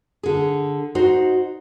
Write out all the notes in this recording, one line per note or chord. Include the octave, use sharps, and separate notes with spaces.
D3 G#4
D#4 F#4 C5